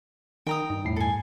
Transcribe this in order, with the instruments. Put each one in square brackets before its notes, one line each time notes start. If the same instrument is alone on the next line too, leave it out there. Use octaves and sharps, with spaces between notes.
[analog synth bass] D#3 [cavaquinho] G5 A#5 D#6
[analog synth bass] G2 [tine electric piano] D#4
[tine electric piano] E2 A2 C7
[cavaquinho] A4 G#5